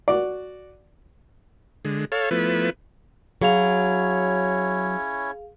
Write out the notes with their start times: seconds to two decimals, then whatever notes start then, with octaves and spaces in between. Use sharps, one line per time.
0.08 F#4 D5
1.85 D3 G#3
2.12 A4 C#5 F5
2.31 F3 A3 B3 E4 B4
3.42 F#3 C#4 E4 G#4 C#5 F5 F7